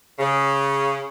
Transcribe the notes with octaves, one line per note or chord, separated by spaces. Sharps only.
C#3